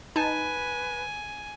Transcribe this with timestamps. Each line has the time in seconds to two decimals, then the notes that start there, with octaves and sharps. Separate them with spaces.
0.16 D#4 B4 G#5 A5